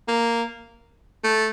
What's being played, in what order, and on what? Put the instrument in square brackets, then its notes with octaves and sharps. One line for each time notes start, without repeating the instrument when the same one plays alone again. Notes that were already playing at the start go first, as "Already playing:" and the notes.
[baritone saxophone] A#3
A3